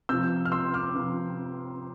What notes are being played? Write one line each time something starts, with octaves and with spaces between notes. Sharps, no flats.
C3 F3 E6 G6
F6
C6 E6
D6 F6
C3 F3